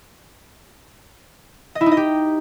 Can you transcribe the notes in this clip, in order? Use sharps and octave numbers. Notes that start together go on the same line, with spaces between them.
D#5
E4
D#4
D#5
G4